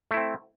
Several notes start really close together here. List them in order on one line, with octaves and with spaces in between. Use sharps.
A3 E4 C4